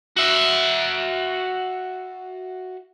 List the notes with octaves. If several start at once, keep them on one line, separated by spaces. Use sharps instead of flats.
F#4 E5